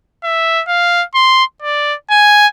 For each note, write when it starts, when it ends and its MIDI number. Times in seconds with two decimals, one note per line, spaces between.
0.24 0.63 76
0.68 1.04 77
1.15 1.44 84
1.62 1.95 74
2.11 2.47 80